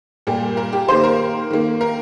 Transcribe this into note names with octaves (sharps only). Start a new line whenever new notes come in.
A#2 G3 A#3 G4
A#4
G4
D#3 A#3 C5
A#4
D#3 A#3
A#4